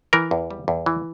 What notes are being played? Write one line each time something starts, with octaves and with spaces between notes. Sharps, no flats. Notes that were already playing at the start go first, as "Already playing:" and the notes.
E3 A#4
E2
G3
E2
E3